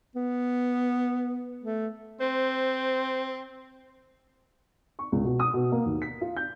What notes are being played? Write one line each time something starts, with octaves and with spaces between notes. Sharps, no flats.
B3
A3
C4 C5
C#6
C#2
B2
D#6
B2
A#3
D#2
B6
F4
G6